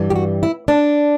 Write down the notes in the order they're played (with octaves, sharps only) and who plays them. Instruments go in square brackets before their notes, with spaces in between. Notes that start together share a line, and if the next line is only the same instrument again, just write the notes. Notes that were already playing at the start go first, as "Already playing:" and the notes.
Already playing: [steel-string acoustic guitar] G2 E3 G3
G4
F#4
E4
D4